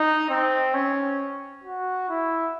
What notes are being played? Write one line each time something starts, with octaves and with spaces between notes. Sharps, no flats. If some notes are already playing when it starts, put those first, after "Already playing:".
Already playing: D#4
C4
C#4
F#4
E4